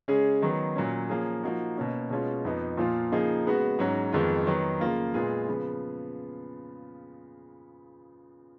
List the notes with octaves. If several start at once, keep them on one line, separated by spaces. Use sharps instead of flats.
C#3 G#3 C#4 G#4
D#3 F#3 B3
A#2 F#3 C#4
F3 A#3 C#4 G#4
F3 A#3 D#4 F#4
B2 A#3 C#4
B2 G#3 C#4 F4
F2 F3 B3 D#4
A#2 F3 A#3 F4
C#3 F3 A#3 D#4 G#4
C#3 G#3 B3 F#4
G#2 F#3 C#4 F#4
F2 D#3 G#3 B3 F4
D#3 F#3 B3
C#3 F3 A#3 F4
A#2 G#3 B3 F4 G#4
C#3 F3 B3